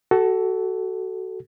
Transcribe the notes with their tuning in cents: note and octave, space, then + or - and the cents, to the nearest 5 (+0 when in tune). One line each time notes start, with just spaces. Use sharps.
F#4 +25 A4 +0